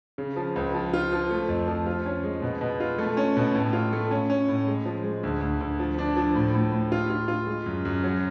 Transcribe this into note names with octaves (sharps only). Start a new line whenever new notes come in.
C#3
F3
C#2
F3
F4
F3
A3
F2
F3
F4
C#4
G#3
B2
B2
F4
A3
C#4
B2
A2
F4
A3
C#4
C#4
A2
G#3
F3
G#3
D2
D2
D2
F3
D4
F3
A2
A2
A2
F4
F4
F4
G#3
F#2
F#2
F#3